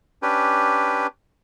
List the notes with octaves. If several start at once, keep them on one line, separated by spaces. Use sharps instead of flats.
C#4 D4 G4 B4